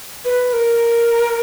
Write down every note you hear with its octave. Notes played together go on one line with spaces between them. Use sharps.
B4
A#4